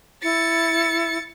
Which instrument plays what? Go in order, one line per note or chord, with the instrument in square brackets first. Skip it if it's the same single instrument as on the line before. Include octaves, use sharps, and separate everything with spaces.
[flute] E4 [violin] A6 C#7